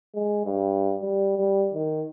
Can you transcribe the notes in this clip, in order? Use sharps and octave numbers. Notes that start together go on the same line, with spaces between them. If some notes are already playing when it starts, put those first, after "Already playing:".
G#3
G2
G3
G3
D#3